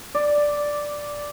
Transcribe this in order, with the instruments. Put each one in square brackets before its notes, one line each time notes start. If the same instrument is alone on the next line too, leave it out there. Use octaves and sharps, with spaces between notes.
[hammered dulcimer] D5